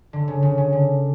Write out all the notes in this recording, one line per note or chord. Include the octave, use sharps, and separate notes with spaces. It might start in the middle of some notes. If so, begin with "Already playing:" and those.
D3
C#3
C#3
C#3
D3